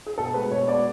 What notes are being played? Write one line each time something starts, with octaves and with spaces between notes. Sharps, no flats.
G#4
B2 A4
G#3 B3 B4
B2 C#5
G#3 B3 D5